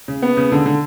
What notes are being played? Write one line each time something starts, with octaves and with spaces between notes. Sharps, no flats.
C#3
B3
C#3
D3
D3